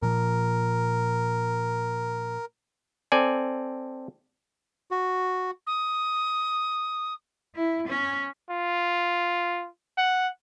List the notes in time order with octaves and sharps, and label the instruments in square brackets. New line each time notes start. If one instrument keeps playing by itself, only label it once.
[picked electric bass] A#2 F3 [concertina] A#4
[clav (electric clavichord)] C4 A4 D5 G#5
[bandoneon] F#4
[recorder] D#6
[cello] E4
C#4
[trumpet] F4
F#5